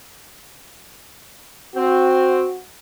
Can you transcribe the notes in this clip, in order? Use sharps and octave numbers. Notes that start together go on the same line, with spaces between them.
C4 F#4